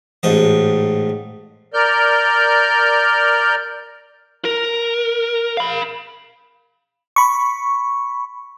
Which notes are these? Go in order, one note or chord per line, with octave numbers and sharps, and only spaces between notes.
A1 G#2 D#5
A#4 D5 F6 G6
A#4
F5 B5
B5 C#6